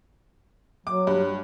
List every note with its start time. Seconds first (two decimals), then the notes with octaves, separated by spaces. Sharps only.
0.87 F#3 D6
1.07 G2